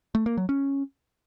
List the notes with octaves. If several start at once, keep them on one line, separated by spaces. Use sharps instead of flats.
A3
A#3
F#3
C#4